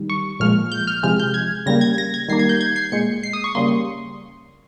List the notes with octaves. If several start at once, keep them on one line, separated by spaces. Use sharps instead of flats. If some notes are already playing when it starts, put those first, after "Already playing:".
Already playing: D#3 G3
C#6
A#2 F3 G#3 F6
G6
F6
C3 F3 G#3 F6
G6
G#6
C#3 G3 A#3 A#6
G#6
A#6
G#6
D#3 G3 A#3 C7
G#6
G6
G#6
C7
A#2 G#3 C#7
C7
D#6
C#6
C#3 G3 A#3 C6